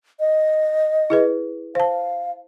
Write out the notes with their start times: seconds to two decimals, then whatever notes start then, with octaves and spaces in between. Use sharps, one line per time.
0.20 D#5
1.10 E4 G#4 B4
1.75 C5 F5 A5